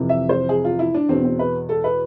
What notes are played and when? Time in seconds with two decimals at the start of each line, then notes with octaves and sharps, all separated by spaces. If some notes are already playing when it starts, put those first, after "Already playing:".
Already playing: F2 C3 E3
0.09 E5
0.29 C5
0.49 G#4
0.64 F4
0.79 E4
0.94 D4
1.09 E2 B2 C4
1.24 C4
1.39 B4
1.69 A4
1.84 B4